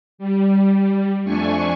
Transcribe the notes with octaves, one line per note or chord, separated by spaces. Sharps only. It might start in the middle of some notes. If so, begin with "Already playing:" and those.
G3
F2 A3 D4 G#5 C#6